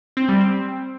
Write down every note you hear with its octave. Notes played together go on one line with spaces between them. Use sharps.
C4
G3
C4